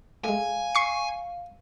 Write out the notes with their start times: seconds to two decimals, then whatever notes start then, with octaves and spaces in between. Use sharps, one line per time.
0.24 A2 G#3 F5 G#5
0.75 C#6 C7